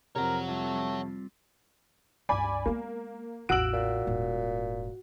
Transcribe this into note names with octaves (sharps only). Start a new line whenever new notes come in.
F2 C3 A#4 C#5 F#5
G3 A3 C4 F4
C#2 G2 D5 G#5 B5
G#3 A#3 B3
A1 E2 F#4 E6 D7 F#7
A#2
D#1 G#2